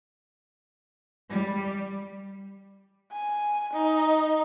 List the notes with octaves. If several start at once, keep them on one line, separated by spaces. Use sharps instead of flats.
G3
G#5
D#4